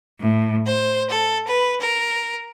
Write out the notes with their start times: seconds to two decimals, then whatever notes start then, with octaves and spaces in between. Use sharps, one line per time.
0.20 A2
0.65 C5
1.10 A4
1.47 B4
1.81 A#4